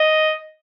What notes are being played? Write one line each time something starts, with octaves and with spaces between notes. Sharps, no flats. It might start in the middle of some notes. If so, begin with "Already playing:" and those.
Already playing: D#5